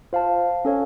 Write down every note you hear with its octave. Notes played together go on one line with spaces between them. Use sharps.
F4 C5 F5 A5
C#4 A4 C#5 F5